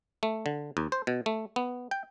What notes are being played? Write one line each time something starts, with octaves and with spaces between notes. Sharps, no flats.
A3
D3
D#2
C5
B2
A3
B3
G5